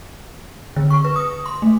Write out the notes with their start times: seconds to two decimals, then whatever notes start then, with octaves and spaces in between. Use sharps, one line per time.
0.76 D3
0.90 C#6
1.04 B4
1.16 D#6
1.46 C6
1.62 A3